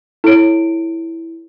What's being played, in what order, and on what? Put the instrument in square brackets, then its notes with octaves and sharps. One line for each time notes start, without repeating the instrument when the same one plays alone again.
[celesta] E4 D7 [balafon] A4 C#5